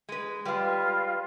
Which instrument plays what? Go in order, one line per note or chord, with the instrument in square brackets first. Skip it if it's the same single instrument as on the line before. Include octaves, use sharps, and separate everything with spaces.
[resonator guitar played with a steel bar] G#3 B4
[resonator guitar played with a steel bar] G3 G#3 [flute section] F4 B4